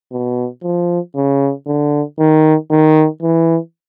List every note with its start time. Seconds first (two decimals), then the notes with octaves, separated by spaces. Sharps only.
0.12 B2
0.63 F3
1.16 C#3
1.66 D3
2.19 D#3
2.71 D#3
3.22 E3